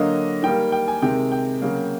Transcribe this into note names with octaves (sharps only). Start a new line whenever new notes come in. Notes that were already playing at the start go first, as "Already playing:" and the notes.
Already playing: D3 F#3 A#3 D#5
D#3 G3 A#3 G5
G5
G#5
C3 D#3 G#3 G5
G5
C#3 F#3 A#3